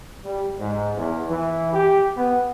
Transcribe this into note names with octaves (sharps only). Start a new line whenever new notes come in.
G3
G#2
E2
E3
G4
B3